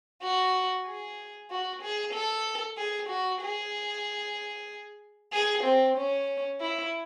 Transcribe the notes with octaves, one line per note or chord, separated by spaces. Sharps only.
F#4
G#4
F#4
G#4
A4
G#4
F#4
G#4
G#4
C4
C#4
E4